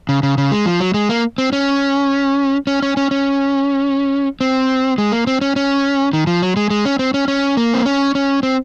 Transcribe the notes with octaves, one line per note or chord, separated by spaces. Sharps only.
C#3
C#3
C#3
G#3
F3
F#3
G#3
A#3
C4
C#4
C#4
C#4
C#4
C#4
C4
G#3
A#3
C4
C#4
C#4
D#3
F3
F#3
G#3
G#3
C#4
C4
C#4
C#4
A#3
C4
C#4
C#4
C4